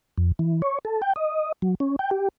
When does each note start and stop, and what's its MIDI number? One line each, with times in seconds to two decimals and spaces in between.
0.18 0.32 41
0.39 0.62 52
0.62 0.79 73
0.85 1.01 69
1.02 1.13 79
1.16 1.52 75
1.62 1.75 54
1.80 1.96 61
1.99 2.10 79
2.11 2.29 67